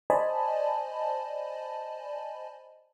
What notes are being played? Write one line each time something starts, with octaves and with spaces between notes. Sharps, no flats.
C5 D5 D#5 G#5 A5 B5